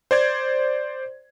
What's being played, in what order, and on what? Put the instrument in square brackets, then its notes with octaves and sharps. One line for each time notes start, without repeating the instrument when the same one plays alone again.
[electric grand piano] C5 D5 G#6